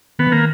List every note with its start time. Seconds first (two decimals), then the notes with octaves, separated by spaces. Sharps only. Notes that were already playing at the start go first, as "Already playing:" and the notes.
0.19 D#3 B3
0.27 E3
0.32 D#3 A#3